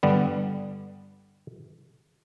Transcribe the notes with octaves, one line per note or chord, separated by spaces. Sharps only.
G2 D3 G3 B3